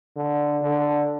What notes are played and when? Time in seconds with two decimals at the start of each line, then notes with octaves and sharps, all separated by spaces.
0.16 D3
0.62 D3